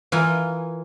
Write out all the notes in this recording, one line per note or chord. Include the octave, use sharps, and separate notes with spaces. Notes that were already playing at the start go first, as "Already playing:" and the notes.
E3 F4 A#4 G#5